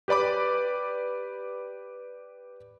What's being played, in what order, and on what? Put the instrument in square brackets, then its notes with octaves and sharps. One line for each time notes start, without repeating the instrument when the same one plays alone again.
[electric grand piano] G4 B4 D5 B5 D6